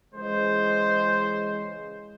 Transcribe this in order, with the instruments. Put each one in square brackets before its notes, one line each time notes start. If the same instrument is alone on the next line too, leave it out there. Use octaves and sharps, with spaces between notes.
[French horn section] C#3 E3 G#3 [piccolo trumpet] C5